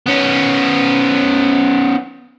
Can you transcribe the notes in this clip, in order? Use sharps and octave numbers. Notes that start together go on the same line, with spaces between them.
B3 C#4